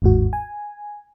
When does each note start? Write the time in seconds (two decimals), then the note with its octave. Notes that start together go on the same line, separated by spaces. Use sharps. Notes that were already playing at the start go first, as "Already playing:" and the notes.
0.02 G1 D#2 G#2 F#4
0.33 G#5